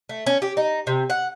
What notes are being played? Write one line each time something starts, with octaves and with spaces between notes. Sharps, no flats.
A3
C#4
G4
D#4
C3
F#5